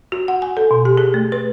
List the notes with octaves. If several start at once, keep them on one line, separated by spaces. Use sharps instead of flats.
F#4
F#5
G#5
A4
B2
G4
G#4
A3
B4